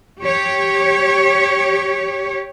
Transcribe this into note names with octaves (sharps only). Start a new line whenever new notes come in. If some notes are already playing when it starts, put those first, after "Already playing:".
G4 C#5